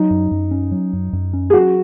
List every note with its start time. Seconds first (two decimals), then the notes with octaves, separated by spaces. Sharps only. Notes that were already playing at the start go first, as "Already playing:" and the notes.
Already playing: F#3 D#4
0.10 F#2
0.31 F#2
0.51 C#4
0.72 F#3
0.93 F#2
1.13 F#2
1.33 C#4
1.50 G#4
1.53 F#3 F#4